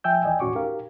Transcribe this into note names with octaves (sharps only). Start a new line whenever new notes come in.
F3 E5 G5 G#5 E6 G6
D#2 E3 D5 D#5 G5 G#5
D#2 A2 C#4 F#4 C#6 D6
D#4 G4 A#4 F5